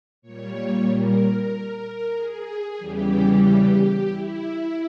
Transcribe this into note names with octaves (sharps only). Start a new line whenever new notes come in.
A#2 G3 C#5
A#4
G#4
E2 C#3 E3 G3 G4
E4